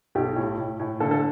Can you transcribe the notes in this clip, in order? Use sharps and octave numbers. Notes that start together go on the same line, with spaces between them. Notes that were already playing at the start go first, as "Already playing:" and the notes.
B1 G4
A2
A2
A2
D3 A4
A4